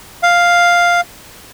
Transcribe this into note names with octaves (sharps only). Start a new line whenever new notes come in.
F5